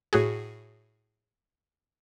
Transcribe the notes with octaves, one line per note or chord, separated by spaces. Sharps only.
A2 F#4 G#4